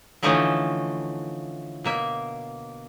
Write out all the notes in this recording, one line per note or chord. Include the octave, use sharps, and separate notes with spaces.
D3 E3 F3 A3 C#4 D#4
B2 A#3 E5